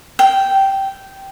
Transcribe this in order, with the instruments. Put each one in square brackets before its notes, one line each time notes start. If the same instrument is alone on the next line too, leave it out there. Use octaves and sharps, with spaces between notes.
[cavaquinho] G5